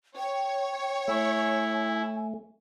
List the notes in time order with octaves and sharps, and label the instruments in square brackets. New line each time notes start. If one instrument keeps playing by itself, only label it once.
[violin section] C#5 [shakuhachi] G5
[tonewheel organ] A3 [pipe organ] E4 [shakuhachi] G#5